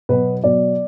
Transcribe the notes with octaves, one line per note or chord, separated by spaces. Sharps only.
B2 F#3 B3 B4
B2 F#3 B3 D5